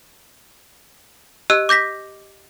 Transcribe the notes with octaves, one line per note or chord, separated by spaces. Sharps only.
G4 D#5 E6 F#6
D6 G6 A#6 B6